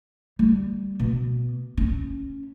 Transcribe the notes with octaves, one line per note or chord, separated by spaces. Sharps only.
G3
B2
C#4